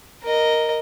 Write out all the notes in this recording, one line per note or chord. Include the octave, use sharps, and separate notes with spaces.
A#4 D#5